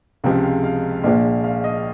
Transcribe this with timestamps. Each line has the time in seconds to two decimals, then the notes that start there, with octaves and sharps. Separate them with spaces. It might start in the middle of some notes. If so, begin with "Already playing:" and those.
0.24 C#2 C3 F3 G#3 F5
0.43 F5
0.64 F5
1.04 A#1 A#2 F3 G#3
1.44 F5
1.64 D#5